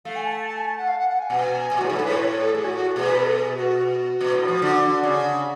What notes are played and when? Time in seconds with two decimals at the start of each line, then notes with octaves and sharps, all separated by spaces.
0.05 A3 F5
0.16 G#5
0.26 A5
0.47 A5
0.57 G#5
0.68 A5
0.78 F#5
0.88 F5
0.99 F#5
1.09 F#5
1.19 G#5
1.29 B2 F#5
1.40 G#5
1.71 B2
1.77 A2 F#4
1.87 G#2 G#4
1.95 A2 A4
2.04 B4
2.13 C#5
2.27 C#5
2.40 A4
2.54 A2 G#4
2.65 F#4
2.75 F#4
2.96 B2 G#4
3.10 B4
3.24 A4
3.37 G#4
3.54 G#4
3.58 F#4
3.78 F#4
4.21 B2
4.34 A2
4.48 F3
4.62 D3
5.03 C#3